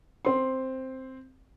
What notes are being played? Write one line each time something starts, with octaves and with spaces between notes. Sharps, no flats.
C4 C6